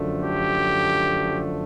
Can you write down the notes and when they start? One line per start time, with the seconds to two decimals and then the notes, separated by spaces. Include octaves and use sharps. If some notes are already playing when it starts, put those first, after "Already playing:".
Already playing: F#2 D3 F3 A3
0.22 G4